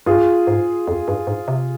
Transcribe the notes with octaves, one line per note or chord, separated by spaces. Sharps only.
G2 F4 G#4
G#2
F2
G2
G#2
C3